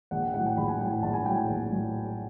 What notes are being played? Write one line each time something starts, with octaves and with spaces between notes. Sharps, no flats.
A#1 F#5
G5
A2 F#3 F#5
G5
A#1 B5
G#5
A2 F#3 G5
G#5
A#1 A5
G#5
A2 F#3 G5
G#5
A#1
A2 F#3